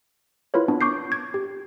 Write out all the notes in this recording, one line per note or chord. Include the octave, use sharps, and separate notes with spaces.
E4 F4 A#4 B4 C#5
B3 D4
C#6 D6 G6 C7
G#6
G4